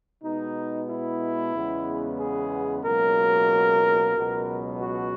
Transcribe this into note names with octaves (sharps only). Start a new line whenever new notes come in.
B2 G#3 B3 D#4
E4
E2 C#3 G#3 B3
G#4
C#2 B2 F#3 A#3 A#4
C#2 B2 F#3 B3
F#4